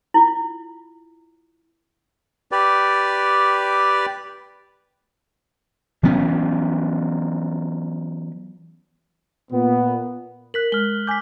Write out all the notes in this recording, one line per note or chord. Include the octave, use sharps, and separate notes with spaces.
E4 F4
G4 B4 D5
E3 F#3 B3 C#4
A#2 B3
A#4 F#6 B6 F#7
G#3 F6 G7
G#5 D6 G6 B6